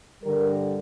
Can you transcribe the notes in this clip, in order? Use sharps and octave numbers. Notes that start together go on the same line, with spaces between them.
G2 D3 G3 A#4